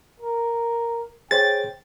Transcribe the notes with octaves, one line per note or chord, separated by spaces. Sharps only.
A#4
G#4 C5 C#5 G5 A6